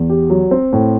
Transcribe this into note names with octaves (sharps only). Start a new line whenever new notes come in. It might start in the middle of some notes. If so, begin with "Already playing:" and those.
Already playing: E2
G4
F#3
C4
A2